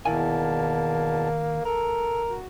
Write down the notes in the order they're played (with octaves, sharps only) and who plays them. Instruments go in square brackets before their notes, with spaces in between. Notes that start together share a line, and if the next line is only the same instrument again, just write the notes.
[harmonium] E2 B2 A5 [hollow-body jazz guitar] D#3 E4 G#5 [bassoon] A#3
[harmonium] A4 [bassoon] A#4
[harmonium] F#4